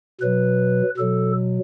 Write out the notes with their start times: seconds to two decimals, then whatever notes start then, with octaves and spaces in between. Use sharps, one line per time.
0.21 B2 F#3 B4
0.98 B2 F#3 A4